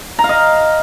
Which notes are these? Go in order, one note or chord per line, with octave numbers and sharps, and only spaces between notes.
A#5
F5
D#5